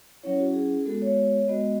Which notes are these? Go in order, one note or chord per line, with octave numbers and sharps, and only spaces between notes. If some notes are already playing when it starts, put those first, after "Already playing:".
F#3 C#4 E4 C#5
F#4
G#4
G#3 B3 F#4 A4
C#5
G#3 B3 F#4 D#5